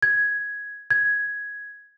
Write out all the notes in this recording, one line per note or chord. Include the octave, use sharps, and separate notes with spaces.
G#6
G#6